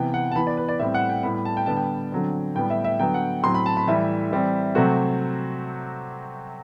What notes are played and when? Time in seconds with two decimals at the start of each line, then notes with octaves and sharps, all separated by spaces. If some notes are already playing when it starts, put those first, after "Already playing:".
Already playing: C3 E3 B3 G5
0.14 F#5
0.32 A5
0.36 E3 B5
0.40 B3
0.47 D5
0.57 B4
0.69 D5
0.79 A2 G3 C4 E5
0.94 F#5
1.10 G5
1.23 A2 G3 B3 B5
1.35 B5
1.45 A5
1.57 G5
1.66 D3 G3 B3 A5
1.77 G5
2.12 D3 F#3 C4
2.55 A2 G3 B3 G5
2.70 E5
2.84 E5
2.99 D3 F#3 B3 G5
3.14 F#5
3.43 A2 F#3 C4 C6
3.54 B5
3.66 A5
3.77 B5
3.87 A2 E3 G3 E5
4.31 E3 G3 C4
4.75 C3 F#3 A3 C4 F#4